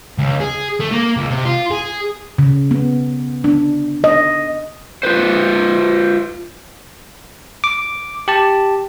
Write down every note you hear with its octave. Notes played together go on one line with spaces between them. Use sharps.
C#2
G#4
A3
A#3
C#2
C3
F4
G#4
C#3
B3
D4
D#5
F4 B4 C5
D6
G4 A5